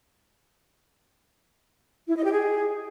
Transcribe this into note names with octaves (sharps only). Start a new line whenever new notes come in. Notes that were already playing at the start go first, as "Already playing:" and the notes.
E4
D#5
G4
G#4